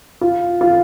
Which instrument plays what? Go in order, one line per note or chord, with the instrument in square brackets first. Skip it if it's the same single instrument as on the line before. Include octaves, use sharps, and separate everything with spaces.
[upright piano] F4
F4